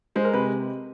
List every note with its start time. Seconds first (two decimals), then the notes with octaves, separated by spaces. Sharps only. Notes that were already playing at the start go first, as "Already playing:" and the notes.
0.15 G#3 C5
0.24 A#4
0.33 C3 B4